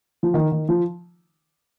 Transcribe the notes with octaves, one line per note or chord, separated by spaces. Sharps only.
F3
D#3
D#3
F3